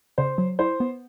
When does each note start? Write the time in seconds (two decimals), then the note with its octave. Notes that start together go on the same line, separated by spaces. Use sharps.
0.18 C#3 C5
0.38 F#3
0.59 E4 C5
0.80 B3